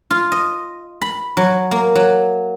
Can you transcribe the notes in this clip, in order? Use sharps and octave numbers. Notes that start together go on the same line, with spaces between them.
F4
D#5
B5
F#3
A#3
F#3